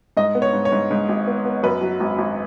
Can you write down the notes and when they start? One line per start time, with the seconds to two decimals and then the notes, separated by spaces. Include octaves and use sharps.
0.17 G#2 D#5
0.35 B3
0.42 C#5
0.53 G#2
0.65 C#5
0.72 G#2
0.91 G#2
1.09 G#1
1.27 B3
1.45 B3
1.63 F#2 B4
1.81 F#3
2.00 G#1
2.18 G#1